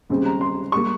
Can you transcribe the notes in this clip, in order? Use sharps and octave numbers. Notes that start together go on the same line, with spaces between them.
D#2 C#3 G3 C4
A#5
C6
G3 A#3 C#6